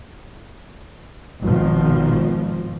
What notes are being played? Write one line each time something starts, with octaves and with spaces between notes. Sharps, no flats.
G#1 B2 D#3 F3